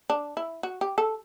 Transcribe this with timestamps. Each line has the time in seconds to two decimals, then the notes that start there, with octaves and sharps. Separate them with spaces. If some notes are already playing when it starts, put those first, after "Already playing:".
0.10 D4
0.37 E4
0.63 F#4
0.81 G4
0.98 A4